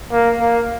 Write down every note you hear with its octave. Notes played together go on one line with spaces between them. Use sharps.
A#3
A#3